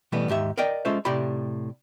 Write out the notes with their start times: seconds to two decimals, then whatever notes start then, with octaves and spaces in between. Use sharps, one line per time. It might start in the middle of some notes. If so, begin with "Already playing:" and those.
0.12 B2 E3 G3 A3 B3
0.28 D#2 G#2 G4 E5
0.58 A#4 D5 D#5 G5
0.85 G#3 C#4 F4 A4 C5 E5
1.05 A2 C3 G4 D5 G5 B5